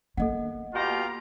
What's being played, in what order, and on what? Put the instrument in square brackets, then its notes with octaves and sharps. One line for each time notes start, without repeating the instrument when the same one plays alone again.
[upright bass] A#3 B3 [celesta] A4 D#5 F#5
[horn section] B2 G4 A#5 [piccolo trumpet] F4